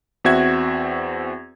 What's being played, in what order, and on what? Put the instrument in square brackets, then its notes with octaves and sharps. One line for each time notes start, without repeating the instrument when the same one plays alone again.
[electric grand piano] E2 C4 F#4 E5 G#6